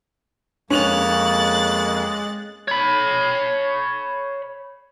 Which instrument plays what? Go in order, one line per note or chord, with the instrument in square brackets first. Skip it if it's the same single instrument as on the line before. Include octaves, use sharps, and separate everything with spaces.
[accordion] F2 A#3 [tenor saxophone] G#3 [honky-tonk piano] C#4 F7 [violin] F#6 A6
[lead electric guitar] C#5 B5